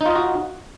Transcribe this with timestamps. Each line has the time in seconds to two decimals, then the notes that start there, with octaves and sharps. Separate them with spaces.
0.01 D#4
0.06 F4
0.11 D#5
0.15 F#4